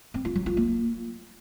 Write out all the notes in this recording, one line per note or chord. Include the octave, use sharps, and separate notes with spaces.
C4
F4
F#3
F4
A#3